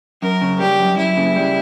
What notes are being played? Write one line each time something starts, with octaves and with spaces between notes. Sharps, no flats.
F#2 A#4
C#3
G3 G4
F#2
F#2 E4
C#3
G3